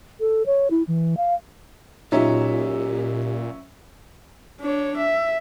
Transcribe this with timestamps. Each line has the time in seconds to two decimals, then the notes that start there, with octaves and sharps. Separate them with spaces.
0.20 A4
0.46 C#5
0.71 E4
0.87 E3
1.17 F5
2.12 A#2 F#3 C#4 D#4 F4 G4 E5
4.61 D4 C#5
4.98 E5